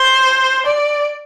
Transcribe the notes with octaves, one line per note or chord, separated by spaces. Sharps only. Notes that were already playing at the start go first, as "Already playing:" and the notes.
Already playing: C5
D5